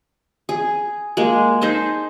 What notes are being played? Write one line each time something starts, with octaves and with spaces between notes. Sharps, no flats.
G#4
G#3 A#3 G#4
D#4 G#4 C5 A5